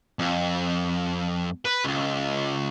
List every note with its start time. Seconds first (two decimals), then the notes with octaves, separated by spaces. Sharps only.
0.19 F2
1.65 B4
1.84 C#2